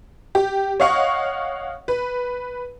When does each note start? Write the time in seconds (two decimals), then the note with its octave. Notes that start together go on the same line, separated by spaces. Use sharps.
0.35 G4
0.80 C#5 D#5 F5 F#5 C#6
1.88 B4